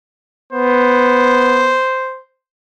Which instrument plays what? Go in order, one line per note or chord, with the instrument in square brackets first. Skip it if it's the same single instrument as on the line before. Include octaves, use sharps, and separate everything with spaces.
[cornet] B3 [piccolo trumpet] C5